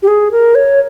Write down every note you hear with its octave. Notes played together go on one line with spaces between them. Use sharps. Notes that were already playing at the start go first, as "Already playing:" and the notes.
G4
G#4
A#4
C#5